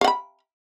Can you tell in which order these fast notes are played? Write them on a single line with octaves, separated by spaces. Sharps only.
F5 F#5 B5